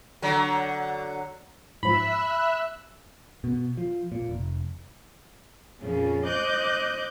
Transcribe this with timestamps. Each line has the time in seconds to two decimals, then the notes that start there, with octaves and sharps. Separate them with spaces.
0.22 D3 F#3
1.83 G#2 F3 E5 B5 E6 F#6
3.44 B2
3.77 F3
4.12 A#2
4.29 F1
5.81 F2 A#2 C#3 F3 C#4
6.25 C5 D#5 D6 F#6 G6